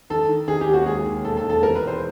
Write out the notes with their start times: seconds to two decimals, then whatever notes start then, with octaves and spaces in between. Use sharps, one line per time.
0.10 D#3 A4
0.29 D#3
0.48 D#3 G#4
0.61 G4
0.67 D#2
0.73 F#4
0.86 G#3 G#4
1.05 D#2
1.24 E1 A4
1.37 A4
1.44 D#3
1.50 A4
1.62 E2 A#4
1.75 B4
1.82 E1
1.87 C5